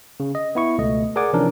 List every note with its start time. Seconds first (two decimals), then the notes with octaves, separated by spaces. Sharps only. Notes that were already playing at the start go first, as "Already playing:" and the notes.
0.20 C#3
0.35 D#5
0.55 B3 E4 C#6
0.78 C#2 B2 A3 D#5
1.16 G#4 A#4 D5 F#5 G#5 D6
1.33 C3 E3 F3 C#4 D4 A#4